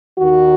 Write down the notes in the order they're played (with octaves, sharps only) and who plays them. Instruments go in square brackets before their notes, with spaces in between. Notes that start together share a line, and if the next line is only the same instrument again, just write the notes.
[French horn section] D#2 D#3 F#4